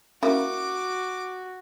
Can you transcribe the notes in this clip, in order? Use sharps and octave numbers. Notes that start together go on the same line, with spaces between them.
A#3 C#4 E4 F#4 D6